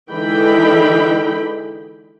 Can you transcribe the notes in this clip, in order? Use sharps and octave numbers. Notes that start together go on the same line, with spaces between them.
D3 E3 G#3 D#4 G5 B5